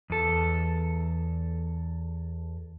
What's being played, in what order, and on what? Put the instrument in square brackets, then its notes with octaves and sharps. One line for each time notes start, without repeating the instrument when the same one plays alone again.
[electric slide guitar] E2 A4